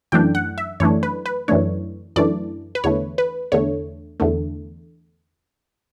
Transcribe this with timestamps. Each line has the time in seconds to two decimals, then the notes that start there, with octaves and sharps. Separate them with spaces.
0.12 F#2 E3 A3 D4 G5
0.35 F#5
0.58 E5
0.80 F#2 E3 A3 D4 C#5
1.03 B4
1.26 B4
1.48 F#2 E3 A3 D4 C#5
2.16 F#2 E3 A3 D4 D5
2.75 B4
2.84 E2 D3 A3 C#5
3.18 B4
3.52 E2 D3 A3 C#5
4.20 E2 D3 A3